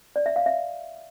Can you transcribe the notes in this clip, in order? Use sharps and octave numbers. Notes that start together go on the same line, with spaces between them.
D5
E5
F5
E5